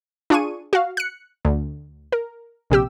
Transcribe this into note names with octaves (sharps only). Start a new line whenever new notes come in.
D4 F4 G#4 C#6 D#7
F#4 F5
F#6 C#7
D2
A#4
A#1 C3 G4 E6